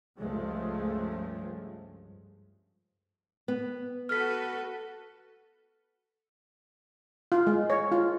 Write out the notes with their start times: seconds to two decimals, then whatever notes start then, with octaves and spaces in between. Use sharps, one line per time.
0.20 C#2 G2 F3 G#3 A3
3.48 B3
4.09 F#4 A4 B4 F6 B6
7.32 F4
7.47 G#3
7.70 C#5
7.92 F4